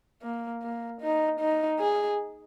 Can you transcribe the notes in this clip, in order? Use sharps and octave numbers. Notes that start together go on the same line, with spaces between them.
A#3
A#3
D#4
D#4
G#4